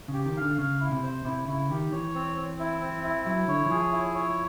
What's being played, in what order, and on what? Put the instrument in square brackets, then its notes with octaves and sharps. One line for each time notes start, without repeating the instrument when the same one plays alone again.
[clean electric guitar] C#3
[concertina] G4
[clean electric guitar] D#3
[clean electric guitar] D3 [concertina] F5
[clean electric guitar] C#3 [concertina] F5
[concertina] E4
[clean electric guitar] C3
[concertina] C5
[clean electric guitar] C3 [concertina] E4
[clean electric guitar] C#3 [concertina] E4
[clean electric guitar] D#3 [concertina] G4
[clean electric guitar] E3 [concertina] C#5
[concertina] C4
C4
E4
C4
E4
[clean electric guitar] F#3 [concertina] E4
[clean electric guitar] D3 [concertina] C#5
[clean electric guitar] E3
[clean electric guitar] F3 [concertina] G#4
[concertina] E4
C#5